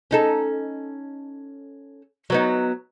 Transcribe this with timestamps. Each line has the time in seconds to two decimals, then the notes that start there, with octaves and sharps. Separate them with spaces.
0.11 C#4 D#4 A4
2.30 F#3 B3 D#4